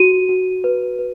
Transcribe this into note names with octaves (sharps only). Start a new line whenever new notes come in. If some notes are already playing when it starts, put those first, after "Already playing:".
Already playing: F#4 D#7
F#4
B4
B4